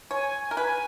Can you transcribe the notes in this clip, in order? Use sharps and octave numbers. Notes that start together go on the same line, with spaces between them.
C#5 G#5
A#4
B4 G#5